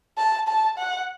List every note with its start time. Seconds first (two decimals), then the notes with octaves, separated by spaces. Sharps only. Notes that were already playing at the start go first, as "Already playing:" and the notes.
0.18 A5
0.48 A5
0.78 F#5